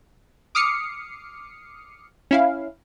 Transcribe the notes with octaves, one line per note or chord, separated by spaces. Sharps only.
D6 D#6 F6 C7 C#7
C#4 E4 F5